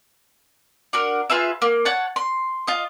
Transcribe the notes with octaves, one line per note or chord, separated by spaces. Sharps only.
D4 F#4 A#4
F4 G#4 B4 E5
A#3
C#5 F#5 A5
C6
F4 D#5